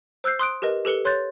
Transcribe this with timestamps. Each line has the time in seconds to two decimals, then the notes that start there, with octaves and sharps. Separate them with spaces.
0.24 C5 E6 F#6 G6 C7
0.39 C6 D#6 F#6 D7
0.62 G4 A#4 B4 D#5
0.85 G4 A4 B4 C#7 G7
1.05 C#5 C6 F#6 G6 A6